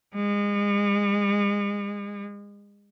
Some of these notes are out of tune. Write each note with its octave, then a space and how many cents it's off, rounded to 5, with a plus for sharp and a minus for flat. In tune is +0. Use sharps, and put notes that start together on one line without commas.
G#3 -35